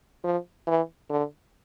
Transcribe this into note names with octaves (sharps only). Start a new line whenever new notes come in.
F3
E3
D3